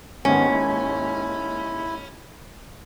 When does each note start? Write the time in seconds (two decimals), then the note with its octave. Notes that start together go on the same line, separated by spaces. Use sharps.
0.25 D#2 G#2 D#3 B3 C#4
0.48 E4